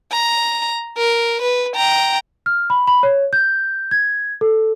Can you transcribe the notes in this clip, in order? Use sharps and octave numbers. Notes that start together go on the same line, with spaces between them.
A#5
A#4
B4
G5 A#5
F6
B5
B5
C#5
G6
G#6
A4